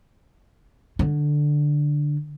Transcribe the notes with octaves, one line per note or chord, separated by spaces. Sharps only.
D3